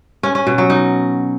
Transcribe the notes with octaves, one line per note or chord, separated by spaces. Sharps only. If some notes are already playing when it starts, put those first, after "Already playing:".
C#4
C#4
B2
F#3
D#4